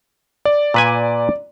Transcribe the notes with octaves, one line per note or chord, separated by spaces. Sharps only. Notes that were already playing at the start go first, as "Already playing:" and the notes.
D5
A#2 B4 G#5